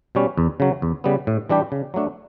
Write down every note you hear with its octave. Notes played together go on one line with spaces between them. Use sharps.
B2 G3 C#4
E2
C#3 F#3
E2
C#3 G3 B3
A2
E3 G3 D4 G4
C#3
F#3 A3 D4